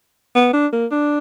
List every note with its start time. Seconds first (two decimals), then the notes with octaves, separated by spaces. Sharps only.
0.35 B3
0.53 D4
0.72 A#3
0.91 D4